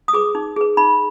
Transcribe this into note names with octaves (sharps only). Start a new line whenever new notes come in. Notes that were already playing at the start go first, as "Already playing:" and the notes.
D#6
G#4 B4 D6
D#4
G#4 B4
D#4 B5